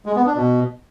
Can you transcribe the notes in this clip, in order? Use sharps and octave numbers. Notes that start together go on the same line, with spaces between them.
G#3
B3
D4
B2